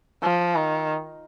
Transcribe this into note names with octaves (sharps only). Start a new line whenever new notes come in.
F3
D#3